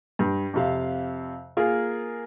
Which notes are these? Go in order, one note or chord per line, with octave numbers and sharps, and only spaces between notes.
G2
F2 C3 F5
A#3 F4 G#4 A#4